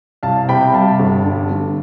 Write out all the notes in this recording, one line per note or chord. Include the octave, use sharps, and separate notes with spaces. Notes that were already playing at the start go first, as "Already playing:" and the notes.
C2 F5 A5
C3 G5 B5
G3 F5 A5
G1
G2
D3